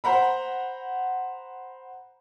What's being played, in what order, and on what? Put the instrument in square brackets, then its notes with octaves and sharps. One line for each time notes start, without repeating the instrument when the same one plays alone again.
[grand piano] C5 F#5 A#5 B5